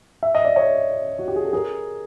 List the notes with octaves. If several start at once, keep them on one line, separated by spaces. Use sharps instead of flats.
E5
D#5
D5
C#5 D#5
F#4
G4
G#4
A4
G#4 A#4